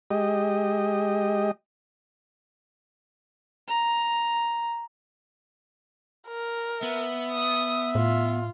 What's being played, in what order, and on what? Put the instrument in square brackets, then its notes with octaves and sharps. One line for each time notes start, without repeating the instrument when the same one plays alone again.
[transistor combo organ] G#3 G4 D#5
[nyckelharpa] A#5
[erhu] A#4
[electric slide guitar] B3 [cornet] E5
[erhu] D#6
[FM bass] A2 [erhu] F4